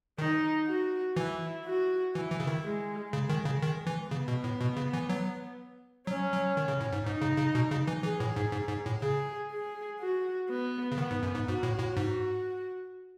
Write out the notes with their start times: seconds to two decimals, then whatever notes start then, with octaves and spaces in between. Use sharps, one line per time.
0.18 D#3 D#4
0.67 F#4
1.16 E3 E4
1.65 F#4
2.15 E3 E4
2.31 E3
2.40 C#3
2.47 D#3
2.64 G#3
3.12 C#3 G#3
3.29 D#3
3.45 C#3
3.63 D#3
3.87 E3
4.11 C#3 B3
4.28 B2
4.44 A2
4.61 B2
4.77 C#3
4.93 E3
5.09 F#3
6.07 F#3 C#4
6.33 F#3
6.57 D#3
6.68 C#3
6.81 A2
6.93 G#2
7.06 G#2 D#4
7.22 C#3
7.38 C#3
7.55 B2
7.71 C#3
7.87 E3
8.03 E3 G#4
8.20 A2
8.36 G#2
8.52 G#2
8.69 G#2
8.86 A2
9.02 C#3 G#4
9.51 G#4
10.00 F#4
10.49 B3
10.92 C#3
10.98 D#3 B3
11.11 G#2
11.23 F#2
11.34 G#2
11.47 G#2 F#4
11.63 A2
11.79 A2
11.96 G#2 F#4